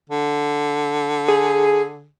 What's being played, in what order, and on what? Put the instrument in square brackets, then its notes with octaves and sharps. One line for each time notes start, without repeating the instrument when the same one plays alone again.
[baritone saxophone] D3
[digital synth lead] G#4